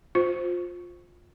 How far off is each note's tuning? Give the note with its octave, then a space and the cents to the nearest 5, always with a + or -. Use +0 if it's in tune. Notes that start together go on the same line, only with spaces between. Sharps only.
F4 +20 C5 +0